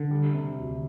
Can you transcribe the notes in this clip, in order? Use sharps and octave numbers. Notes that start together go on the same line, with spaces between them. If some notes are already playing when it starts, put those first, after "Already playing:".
Already playing: D3
G3
C3
D2